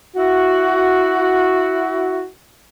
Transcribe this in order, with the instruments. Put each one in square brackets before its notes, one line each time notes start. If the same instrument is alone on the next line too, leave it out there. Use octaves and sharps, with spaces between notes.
[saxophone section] E4 F#4